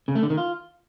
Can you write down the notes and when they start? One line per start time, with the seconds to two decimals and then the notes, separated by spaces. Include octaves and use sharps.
0.08 C#3
0.15 A3
0.23 D3
0.30 D#3
0.37 F4